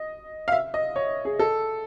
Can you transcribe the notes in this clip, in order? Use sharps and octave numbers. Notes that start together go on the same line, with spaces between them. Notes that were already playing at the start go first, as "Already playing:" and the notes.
Already playing: D#5
F5
E5
D#5
C#5
G#4
A4